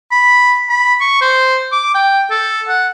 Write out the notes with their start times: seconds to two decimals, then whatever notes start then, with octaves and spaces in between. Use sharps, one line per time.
0.12 B5
0.69 B5
1.00 C#6
1.21 C5
1.72 D6
1.94 G5
2.30 A4
2.69 F#5